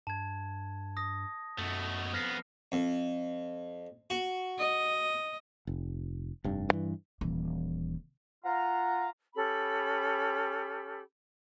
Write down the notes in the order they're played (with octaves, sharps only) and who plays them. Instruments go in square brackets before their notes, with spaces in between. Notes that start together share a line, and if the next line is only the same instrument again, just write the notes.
[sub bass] G2 [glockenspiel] A5 G#6
[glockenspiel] D#6 A#6
[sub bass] F#2 [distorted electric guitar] B2 A3
[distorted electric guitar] F2 B3 [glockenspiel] F6 A#6 C7
[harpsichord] F2
F#4
[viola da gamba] D#5
[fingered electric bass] F1
F1 G2
G2 E3
[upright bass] D#1 E3
[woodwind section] F4 A#5 [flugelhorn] F#5
[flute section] C#4 G4 A4 B5